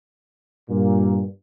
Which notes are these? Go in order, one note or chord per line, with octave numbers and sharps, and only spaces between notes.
G2 A#2